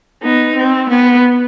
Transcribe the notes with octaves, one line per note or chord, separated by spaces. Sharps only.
B3 D#4
C4
B3